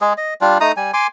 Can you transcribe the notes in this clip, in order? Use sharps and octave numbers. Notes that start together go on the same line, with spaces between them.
G#3 G#4
D#5
G3 D4 F4
A3 D#4 A#5 D#6
G3 G#5
G#5 C6 D6